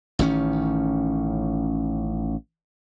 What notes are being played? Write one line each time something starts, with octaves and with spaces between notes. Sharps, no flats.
A1 D#3 C#4